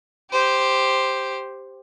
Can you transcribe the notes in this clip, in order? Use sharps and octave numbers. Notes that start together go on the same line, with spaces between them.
G4 C5